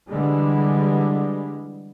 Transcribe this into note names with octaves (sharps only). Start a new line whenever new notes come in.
D3 E3 G3 G#3